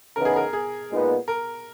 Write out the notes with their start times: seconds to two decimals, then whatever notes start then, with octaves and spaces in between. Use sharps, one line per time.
0.16 C#3 E3 B3 D#4 A#4
0.25 G#4
0.36 A#4
0.53 G#4
0.90 A#2 G#3 B3 D#4
1.28 A#4